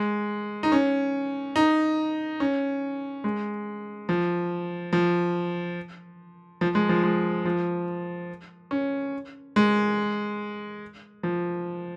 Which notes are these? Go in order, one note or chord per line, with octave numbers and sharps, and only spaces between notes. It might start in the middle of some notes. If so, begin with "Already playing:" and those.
Already playing: G#3
D#4
C#4
D#4
C#4
G#3
F3
F3
F3
G#3
F3
G#3
F3
C#4
G#3
F3